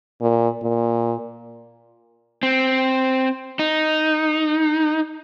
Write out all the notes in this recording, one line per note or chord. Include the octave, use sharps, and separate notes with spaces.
A#2
A#2
C4
D#4